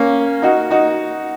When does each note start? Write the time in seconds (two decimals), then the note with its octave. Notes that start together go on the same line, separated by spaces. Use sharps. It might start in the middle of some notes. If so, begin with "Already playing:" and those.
Already playing: A#3 C#4
0.42 D#4 F#4
0.71 D#4 F#4